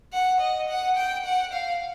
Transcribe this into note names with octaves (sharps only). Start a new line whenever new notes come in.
F#5
D#5
F#5
G5
F#5
F5